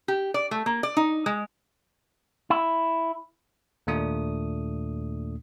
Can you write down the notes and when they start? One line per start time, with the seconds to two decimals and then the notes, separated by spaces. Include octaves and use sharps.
0.08 G4
0.34 D5
0.51 A3
0.66 A#3
0.83 D5
0.97 D#4
1.26 G#3
2.50 E4
3.87 D#2 A#2 A3 D4 D#6